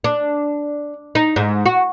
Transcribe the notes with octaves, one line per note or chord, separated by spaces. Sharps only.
D4
D#4
G#2
F#4